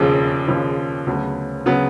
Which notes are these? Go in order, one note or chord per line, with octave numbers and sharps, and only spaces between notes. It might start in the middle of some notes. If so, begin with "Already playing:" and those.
Already playing: E1 D#2 C#3 F3
E1 D#2 C#3 F3
D2 C#3 F#3 B3
C#3 F#3 B3